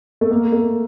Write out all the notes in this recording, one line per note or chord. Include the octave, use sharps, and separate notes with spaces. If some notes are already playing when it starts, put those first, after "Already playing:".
A3
A#3
A3